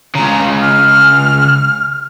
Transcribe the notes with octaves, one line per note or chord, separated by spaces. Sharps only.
C#2 C#3 A#5
F6